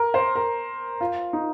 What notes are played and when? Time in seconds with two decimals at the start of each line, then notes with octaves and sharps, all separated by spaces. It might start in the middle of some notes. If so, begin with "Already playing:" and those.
Already playing: A#4
0.14 C5
0.35 A#4
1.01 F4
1.33 D#4